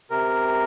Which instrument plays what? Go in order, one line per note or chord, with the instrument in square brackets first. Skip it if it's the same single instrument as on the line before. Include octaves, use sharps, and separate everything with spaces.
[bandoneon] C3 A#4